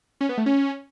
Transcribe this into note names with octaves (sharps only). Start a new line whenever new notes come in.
C#4
B3
A3
C#4